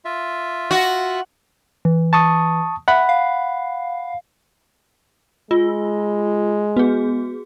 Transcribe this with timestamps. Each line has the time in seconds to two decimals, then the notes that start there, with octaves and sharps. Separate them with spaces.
0.05 F4 E5
0.71 F#4
1.85 E3
2.13 A5 C#6 D#6
2.88 E5 F#5 B5
3.09 F5
5.51 G#3 F4
6.77 B3 F#4 G#4